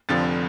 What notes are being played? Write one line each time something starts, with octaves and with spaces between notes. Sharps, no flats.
F1 F2 D3 F3 A6